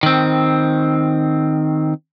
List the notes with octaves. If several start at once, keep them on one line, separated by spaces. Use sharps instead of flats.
D#3 C4